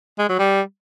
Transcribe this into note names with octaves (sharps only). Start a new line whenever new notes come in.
G#3
F#3
G3